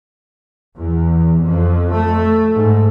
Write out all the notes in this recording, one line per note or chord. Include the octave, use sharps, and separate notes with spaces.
E2
F2
A3
G#2